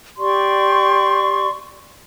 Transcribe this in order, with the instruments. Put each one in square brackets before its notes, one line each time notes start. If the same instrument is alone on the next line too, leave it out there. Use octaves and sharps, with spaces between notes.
[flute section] G4 D5 C6 C#6